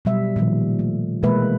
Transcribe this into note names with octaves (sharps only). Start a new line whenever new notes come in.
B2 F#3 G3 E5
A#2 D#3 F3 G3
A3
B2 E3 G#3 A#3 B4 E5